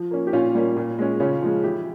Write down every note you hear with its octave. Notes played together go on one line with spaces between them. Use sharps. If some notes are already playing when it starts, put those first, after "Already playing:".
Already playing: F3
A#3 C#4
G4
A#2 C#4 F4
G3 A#3 C#4
A#2
G#3 C#4
C#3 C#4 F4
F3 G#3
E3 E4 G4